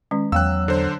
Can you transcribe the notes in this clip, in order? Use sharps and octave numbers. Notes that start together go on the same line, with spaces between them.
D#3 G#3 C#4
E2 F#3 F5 G5 E6 F#6
D3 C5